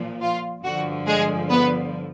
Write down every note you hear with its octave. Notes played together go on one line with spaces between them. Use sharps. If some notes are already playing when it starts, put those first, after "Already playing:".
Already playing: A#2 F3
F4
G2 D3 F3 F#4
G#3 G#4
B3 B4